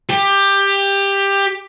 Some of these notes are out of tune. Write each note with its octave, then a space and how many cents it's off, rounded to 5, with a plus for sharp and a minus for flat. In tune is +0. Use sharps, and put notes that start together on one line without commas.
G4 +15